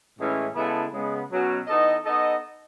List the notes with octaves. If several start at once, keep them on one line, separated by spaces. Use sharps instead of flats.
A2 E3 G#3 C#4 E4
C#3 G#3 B3 E4 A4
C#3 G#3 B3
B2 F#3 C#4
E3 B3 D#4 A4 D#5
B3 D#4 A4 D#5